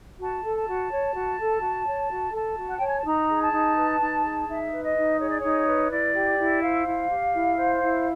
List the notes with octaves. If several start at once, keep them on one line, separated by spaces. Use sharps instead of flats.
F#4 A5
A4
A5
F#4
C#5
F#4
A4
F#4
C#5
F#4
A4 A5
F#4
F#5
C#5 G5
G#5
A5
D#4 A#5
G#4
A5
D#4
B4
D#4
G#4
D#4 E5
B4
D#5
D#4
G#4 C#5
D5
D#4 C#5
B4
E4 D5
G4
E4
C5 F5
E4
G4
E4
C5
E4